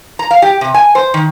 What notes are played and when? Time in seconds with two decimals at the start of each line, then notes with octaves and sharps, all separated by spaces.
0.19 A#5
0.31 F5
0.42 G4
0.61 C3
0.74 G#5
0.95 C5
1.14 D#3